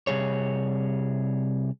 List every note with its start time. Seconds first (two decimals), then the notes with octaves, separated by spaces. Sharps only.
0.07 C3 G3 G#4 C#5